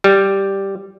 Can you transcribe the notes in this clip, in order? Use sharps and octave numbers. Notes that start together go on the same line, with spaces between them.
G3